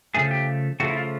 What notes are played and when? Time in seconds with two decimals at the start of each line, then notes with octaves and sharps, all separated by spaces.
0.14 C#3 F3 A3 G#4
0.31 G4
0.80 C#3 F3 A3 F#4
0.90 E4
0.97 F4